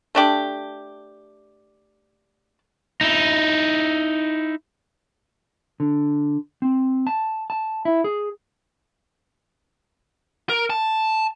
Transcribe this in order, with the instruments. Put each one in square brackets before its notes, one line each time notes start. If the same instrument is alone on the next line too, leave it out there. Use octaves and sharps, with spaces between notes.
[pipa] A3 D4 G4
[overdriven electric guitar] D#4 E4
[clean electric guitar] D3
C4
A5
A5
E4
G#4
[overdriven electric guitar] A#4
A5